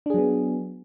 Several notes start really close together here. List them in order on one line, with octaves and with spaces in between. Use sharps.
D4 G#4 F#3 B3